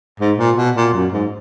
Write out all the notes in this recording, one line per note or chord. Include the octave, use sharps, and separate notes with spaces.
G#2
A#2
B2
A#2
F#2
G#2